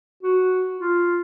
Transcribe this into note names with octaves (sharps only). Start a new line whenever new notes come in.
F#4
F4